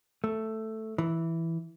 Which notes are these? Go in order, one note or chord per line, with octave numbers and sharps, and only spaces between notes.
A3
E3